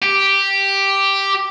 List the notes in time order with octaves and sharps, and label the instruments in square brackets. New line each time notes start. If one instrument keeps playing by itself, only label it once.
[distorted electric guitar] G4